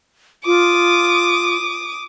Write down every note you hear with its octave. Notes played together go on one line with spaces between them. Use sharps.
F4 D6 D#6